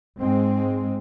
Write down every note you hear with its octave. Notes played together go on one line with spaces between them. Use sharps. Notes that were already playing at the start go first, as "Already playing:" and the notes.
G#2 G#3 C4